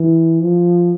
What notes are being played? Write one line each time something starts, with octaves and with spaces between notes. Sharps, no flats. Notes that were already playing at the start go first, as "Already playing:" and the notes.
Already playing: E3
F3